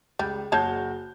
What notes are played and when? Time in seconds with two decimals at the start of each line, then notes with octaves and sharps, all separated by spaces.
0.19 C#2 G3
0.52 F#1 F#4 G#4 C#5 A5 G6